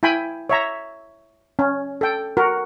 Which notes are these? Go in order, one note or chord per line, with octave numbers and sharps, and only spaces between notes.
E4 G5 G#5 B5
C#5 E5 A#5
C#4
A4 G5
F#4 A#4